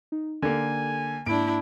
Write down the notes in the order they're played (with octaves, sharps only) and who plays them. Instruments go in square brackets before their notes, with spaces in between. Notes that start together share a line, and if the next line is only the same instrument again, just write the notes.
[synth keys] D#4
[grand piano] D3 A#3 [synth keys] G4 A4 G5 [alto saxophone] G#5
[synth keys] G#2 A#3 [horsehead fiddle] D4 E4 [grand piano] D7